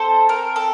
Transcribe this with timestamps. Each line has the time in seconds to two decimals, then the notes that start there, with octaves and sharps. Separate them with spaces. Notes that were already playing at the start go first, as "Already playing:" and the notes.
Already playing: C4 A4 C5
0.29 A#4
0.56 A4